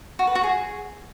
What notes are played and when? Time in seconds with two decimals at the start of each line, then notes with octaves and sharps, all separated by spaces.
0.19 F#4
0.27 B4
0.35 F#4
0.44 G#4